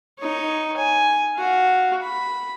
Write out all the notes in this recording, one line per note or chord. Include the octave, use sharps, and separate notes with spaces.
D#4 C#5
G#5
F#4 F5
B5